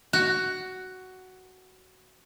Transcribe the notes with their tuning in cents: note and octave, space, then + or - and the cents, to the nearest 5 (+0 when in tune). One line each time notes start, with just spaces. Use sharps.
F#4 +10